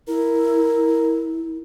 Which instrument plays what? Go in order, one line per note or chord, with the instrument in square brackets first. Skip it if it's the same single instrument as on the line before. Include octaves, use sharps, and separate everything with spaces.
[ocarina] E4 [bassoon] A#4